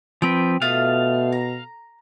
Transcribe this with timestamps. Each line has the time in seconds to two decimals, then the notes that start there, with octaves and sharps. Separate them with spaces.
0.22 F3 C4 B4 G5
0.62 B2 A3 F4 F5 D#6
1.32 A#5